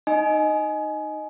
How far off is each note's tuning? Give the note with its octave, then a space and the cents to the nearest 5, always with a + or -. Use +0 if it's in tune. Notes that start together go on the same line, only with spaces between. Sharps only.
D#4 -10 D#5 +0 G#5 +20